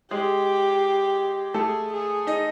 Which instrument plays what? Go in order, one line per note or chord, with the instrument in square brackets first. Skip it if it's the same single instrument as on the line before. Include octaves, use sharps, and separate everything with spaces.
[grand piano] G#3 G#4 [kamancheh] G4
[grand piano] A3 A4 [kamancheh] G#4
[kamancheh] G#4
[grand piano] D#4 D#5